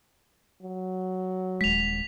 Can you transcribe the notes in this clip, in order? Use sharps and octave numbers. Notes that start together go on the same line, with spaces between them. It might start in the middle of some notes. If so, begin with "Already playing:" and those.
F#3
D#1 G#3 B6 F7